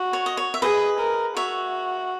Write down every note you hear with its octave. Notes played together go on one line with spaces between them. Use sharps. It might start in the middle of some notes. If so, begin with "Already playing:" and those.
Already playing: F#4
C#5
D#5
C#5
E5
G#4 B4 D#5
A#4
F#4 C#5 E5